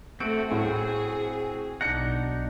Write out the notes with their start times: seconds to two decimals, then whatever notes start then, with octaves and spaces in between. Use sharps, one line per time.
0.20 A3 C4 F#4 D7
0.51 A2 G#4 F#5
1.81 B1 D4 D#4 F#5 A#6 C#7